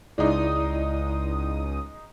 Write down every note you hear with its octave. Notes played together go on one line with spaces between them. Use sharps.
C#2 G#3 D#4 E4 D5 D#6